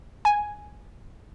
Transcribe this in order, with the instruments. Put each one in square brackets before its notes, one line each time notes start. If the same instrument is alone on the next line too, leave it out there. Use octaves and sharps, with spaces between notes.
[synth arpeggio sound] G#5